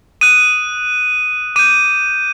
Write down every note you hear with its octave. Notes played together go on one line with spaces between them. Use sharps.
D#6 F#6 D#7
D6 G6 D#7